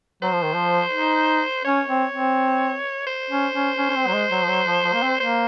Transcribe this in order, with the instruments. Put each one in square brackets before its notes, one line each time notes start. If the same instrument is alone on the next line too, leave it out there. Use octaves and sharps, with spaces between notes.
[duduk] F#3 [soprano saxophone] C5
[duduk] F3
D#3
F3
D#4
[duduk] C#4 [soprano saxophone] C#5
[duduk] C4
C4
[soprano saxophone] C5
[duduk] C#4
C#4
C#4
C#4
C4
F#3
G#3
F#3
F3
F#3
F3
F3
A#3
C4
[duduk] A#3 [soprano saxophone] C5